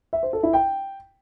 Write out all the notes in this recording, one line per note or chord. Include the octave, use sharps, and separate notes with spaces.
E5
C5
A4
E4
G5